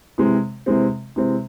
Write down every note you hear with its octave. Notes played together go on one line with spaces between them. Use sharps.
C3 E3 G#3 C4
C3 E3 G#3 C4
C3 E3 G#3 C4